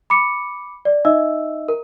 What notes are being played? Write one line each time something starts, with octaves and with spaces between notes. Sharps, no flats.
B5 D6 C#7
D5
D#4 D#5 E5 E6
A#4